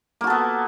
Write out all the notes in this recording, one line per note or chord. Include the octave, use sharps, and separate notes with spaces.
A#3 B3 F#4 A4